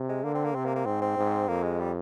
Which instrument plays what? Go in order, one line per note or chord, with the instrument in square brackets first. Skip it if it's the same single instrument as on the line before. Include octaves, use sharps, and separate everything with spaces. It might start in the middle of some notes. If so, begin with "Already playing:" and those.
Already playing: [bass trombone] C3
[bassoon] G#3
[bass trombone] D3 [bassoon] A#3
[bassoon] C4
A#3
[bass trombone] C3 [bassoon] C4
[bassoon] A#3
A#3
[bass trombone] G#2 [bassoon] C4
[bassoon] C4
[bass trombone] G#2
[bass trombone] F2 [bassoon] A#3
[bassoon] G#3
G3